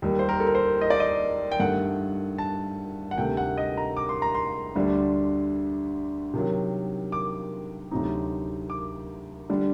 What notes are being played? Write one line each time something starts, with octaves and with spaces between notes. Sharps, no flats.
D#2 D#3 G3
C5
A#4
A4
A#4
C5
D#5
D5
D#5
G5
G2 D#3 A3 F#5
A5
F#5
D2 C3 D#3 A3 G5
F#5
D#5
A#5
D6
C6
A#5
C6
D2 D3 G3 D4
C3 D#3 F#3
D6
D2 C3 F#3 C4 D#4
D6
D3 G3 D4